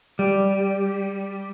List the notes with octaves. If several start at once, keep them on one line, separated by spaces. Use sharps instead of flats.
G3